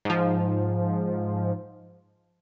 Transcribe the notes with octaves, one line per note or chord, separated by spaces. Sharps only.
G#2 F3